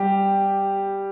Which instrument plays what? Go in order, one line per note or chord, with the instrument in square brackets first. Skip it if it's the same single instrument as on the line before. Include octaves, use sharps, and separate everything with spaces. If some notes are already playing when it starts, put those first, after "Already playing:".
Already playing: [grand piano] G3 G4